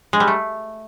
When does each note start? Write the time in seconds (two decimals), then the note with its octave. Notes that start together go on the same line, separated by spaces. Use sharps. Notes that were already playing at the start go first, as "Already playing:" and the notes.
0.13 G#3
0.20 G3
0.28 A3